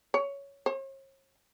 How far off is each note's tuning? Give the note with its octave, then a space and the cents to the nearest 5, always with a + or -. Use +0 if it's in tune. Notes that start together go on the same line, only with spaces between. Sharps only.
C#5 +10
C#5 -45